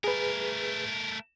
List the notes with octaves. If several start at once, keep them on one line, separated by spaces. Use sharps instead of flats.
A3 G#4 A#4 B4